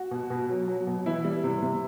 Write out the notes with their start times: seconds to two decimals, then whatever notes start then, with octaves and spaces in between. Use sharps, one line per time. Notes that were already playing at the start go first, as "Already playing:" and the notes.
Already playing: F#4
0.11 B2
0.30 B2
0.49 F#3
0.68 F#3
0.87 B2
1.06 E3 E4
1.25 G3
1.44 C3
1.62 C3